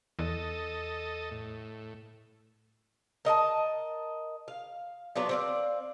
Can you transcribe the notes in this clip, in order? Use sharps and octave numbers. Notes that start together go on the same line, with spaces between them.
E2 A4 D#5
A2
A#4 D#5 E5 A5
F5
F#3 B3 D4 F4
C4 D5 F5